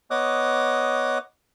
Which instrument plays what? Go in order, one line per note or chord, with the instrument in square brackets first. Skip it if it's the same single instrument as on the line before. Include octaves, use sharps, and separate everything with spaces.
[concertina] B3 C#5 D#5 D6 D#6 F#6